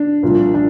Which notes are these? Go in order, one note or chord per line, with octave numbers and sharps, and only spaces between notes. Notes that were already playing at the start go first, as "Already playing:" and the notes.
Already playing: D4
C2 A#2 F3
F3 D4